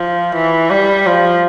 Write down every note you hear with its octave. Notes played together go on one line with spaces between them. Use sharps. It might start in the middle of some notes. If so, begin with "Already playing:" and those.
Already playing: F3
E3
G3
F3